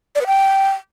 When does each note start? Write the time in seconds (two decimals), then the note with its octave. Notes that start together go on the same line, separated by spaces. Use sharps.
0.15 D5
0.21 B4
0.27 G5